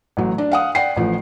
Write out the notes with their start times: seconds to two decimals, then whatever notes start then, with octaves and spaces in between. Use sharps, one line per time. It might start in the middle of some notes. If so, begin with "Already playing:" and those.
0.17 A1 F#3
0.38 D4
0.51 F5 F#5 D#6
0.75 D5 F#5 G5 C7
0.97 A1 F3